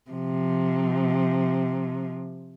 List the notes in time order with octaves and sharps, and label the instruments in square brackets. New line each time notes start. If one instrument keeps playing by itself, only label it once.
[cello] C3 F3